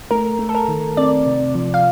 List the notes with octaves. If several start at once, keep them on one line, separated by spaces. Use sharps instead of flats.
A3 A#4
A3
A4
A#4
D#3
C4 D5
C3
F3
F5